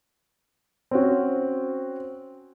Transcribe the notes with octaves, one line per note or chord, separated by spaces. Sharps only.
C4 C#4 F#4